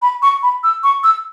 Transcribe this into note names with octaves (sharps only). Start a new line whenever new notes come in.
B5
C#6
B5
E6
C#6
E6